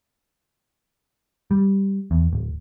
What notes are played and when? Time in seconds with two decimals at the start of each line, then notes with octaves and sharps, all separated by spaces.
1.51 G3
2.11 E2
2.33 D1